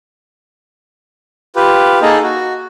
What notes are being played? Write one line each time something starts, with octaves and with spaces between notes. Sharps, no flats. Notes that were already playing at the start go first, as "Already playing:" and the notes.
F4 G4 B4
A#3 D#4 G#4 A4 D#5
F#4